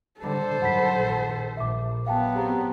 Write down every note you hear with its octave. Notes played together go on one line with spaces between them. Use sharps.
D3 G3 A4 C5
F#2 F#5 B5 B6
A#1 D#3
A#1 E5 D6
F#3 B3 F5 G5 A5
C4 G4 G#4 A#5